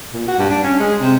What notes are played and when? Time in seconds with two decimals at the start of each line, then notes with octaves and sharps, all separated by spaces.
0.13 A#2
0.28 F#4
0.39 G2
0.50 D4
0.64 C#4
0.80 G#3
1.01 C3